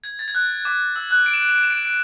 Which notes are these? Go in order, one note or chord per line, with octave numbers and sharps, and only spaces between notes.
G#6
A6
G#6
F#6
D6
E6
F#6
D7
E7
D7
E7
D7
E7
D7
E7
D7